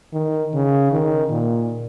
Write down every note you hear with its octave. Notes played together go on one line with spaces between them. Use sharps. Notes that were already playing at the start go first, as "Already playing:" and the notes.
D#3
C#3
D#3
A#2